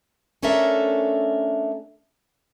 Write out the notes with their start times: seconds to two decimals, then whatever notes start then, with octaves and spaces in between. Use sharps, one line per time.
0.43 A3 C#4 D4 A4 A#4 E5